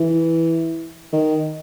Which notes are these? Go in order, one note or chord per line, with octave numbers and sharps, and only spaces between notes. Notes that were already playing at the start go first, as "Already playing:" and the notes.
Already playing: E3
D#3